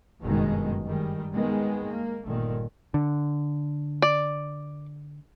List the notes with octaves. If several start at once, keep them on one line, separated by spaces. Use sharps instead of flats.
F#1 G2 B2 D#3 G#3
D#3 G3 G#3
D#3 G#3 B3
A#3
G1 A#2 D#3 A3
D3
D5